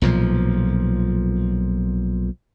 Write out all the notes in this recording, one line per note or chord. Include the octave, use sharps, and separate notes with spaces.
B1 A#2 F3